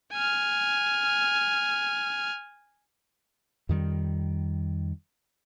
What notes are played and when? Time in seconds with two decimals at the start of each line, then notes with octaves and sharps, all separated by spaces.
0.12 G#5 F6
3.69 F2 D#3 G3